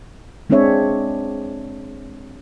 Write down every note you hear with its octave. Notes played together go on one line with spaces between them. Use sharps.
G#3 C4 D4 G#4 C#5 E5